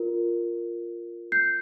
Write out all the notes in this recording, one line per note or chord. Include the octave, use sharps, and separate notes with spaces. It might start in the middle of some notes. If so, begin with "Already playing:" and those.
Already playing: F4 A#4
G6 C7